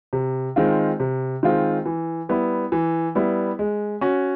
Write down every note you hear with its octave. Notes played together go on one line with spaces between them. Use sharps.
C3
D#3 G#3 C4 F4
C3
D#3 G#3 C4 F4
E3
G3 B3 E4
E3
G3 B3 E4
G#3
C#4 F#4